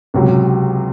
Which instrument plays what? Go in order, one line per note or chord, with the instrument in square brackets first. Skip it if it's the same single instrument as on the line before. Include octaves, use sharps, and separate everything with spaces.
[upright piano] C#2 C3 F#3